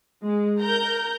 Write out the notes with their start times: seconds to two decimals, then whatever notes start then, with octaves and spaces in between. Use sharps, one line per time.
0.24 G#3
0.60 A#4 A#5 G6